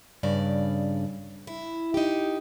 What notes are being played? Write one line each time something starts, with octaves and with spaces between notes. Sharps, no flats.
G2 C#3 D5
E4
D#4 G4